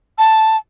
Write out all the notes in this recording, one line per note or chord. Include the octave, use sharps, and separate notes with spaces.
A5